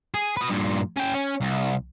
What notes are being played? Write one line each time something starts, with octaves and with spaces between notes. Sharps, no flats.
G#4
B4 D#5
G2 A#2
C#4 G5
C#4
C2